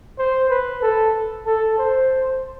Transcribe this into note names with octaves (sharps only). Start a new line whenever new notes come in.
C5
B4
A4
A4
C5